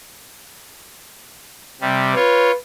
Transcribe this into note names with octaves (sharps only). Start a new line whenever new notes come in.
C3 G3
F4 B4 C#5